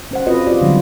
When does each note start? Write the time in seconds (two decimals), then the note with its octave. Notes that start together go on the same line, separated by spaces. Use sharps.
0.11 C#4 C5 F#5
0.27 C4 F4 F#4 B4 D#5
0.47 F4 G4 D5
0.61 D3 F#3 G3 B3